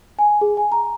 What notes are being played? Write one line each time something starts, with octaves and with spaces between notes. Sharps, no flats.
G#5
G#4
G#5
A#5